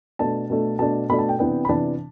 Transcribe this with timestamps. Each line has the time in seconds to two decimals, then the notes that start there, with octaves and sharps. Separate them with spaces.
0.19 B2 A3 D4 A5
0.50 B2 A3 D4
0.79 B2 A3 D4 A5
1.09 B2 A3 D4 B5
1.19 A5
1.29 G5
1.39 C3 E3 B3 D4 G5
1.65 B5
1.69 C3 E3 B3 D4 A5